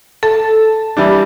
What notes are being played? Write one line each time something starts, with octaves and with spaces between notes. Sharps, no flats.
A4 A5
E3 G3 D4